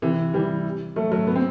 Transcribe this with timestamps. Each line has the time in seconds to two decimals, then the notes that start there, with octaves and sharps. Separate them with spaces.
0.02 C3 E3
0.34 E3 G3
0.96 F#3 A3
1.12 F#3 A3
1.27 B3
1.36 C4